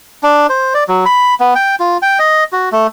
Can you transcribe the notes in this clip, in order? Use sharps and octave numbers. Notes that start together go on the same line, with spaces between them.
D4
C5
D5
F#3
B5
B3
G5
F4
G5
D#5
F#4
A3